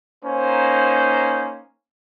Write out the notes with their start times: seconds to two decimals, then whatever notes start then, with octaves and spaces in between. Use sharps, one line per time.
0.25 A#3 C#4 D#4 C5